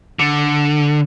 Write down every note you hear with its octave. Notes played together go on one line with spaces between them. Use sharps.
D3